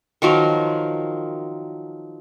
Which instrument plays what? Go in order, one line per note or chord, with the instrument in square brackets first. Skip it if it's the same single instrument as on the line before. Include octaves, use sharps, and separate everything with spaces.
[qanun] D#3 F3 F#3 A#4